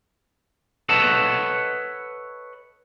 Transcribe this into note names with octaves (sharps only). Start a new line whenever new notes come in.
A4 B4 C#5 D#5 F#5 A5